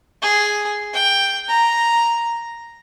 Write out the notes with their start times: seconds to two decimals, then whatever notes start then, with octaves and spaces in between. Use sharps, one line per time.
0.22 G#4
0.94 G5
1.49 A#5